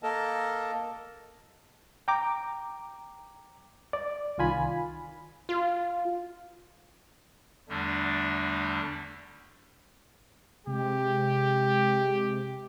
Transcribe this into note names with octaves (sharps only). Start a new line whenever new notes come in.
A#3 A4 A#4 D#5 A5
G5 A#5 D6
D5
C2 D#3 F4 G#5 B5
F4
E2 D3 G3 A3 D4
C3 G#3 G4